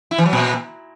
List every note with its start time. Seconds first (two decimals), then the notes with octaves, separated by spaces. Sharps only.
0.11 E4
0.18 E3
0.26 F#3
0.33 A#2